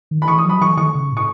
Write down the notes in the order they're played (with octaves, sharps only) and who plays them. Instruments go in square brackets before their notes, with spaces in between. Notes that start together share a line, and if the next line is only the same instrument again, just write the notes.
[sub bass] D#3
[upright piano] B5
[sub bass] E3 [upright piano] C#6
[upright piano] D#6
[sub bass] F#3 [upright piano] B5
[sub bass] E3 [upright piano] C#6
[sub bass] D#3 [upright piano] C#6
[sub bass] C#3
A2
[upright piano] C#6